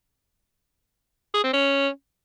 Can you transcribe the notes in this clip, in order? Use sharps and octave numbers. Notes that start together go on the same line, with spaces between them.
G#4
C4
C#4